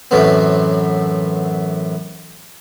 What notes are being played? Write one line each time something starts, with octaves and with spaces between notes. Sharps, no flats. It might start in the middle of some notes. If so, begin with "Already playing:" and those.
F#2 A2 E3 B3 C4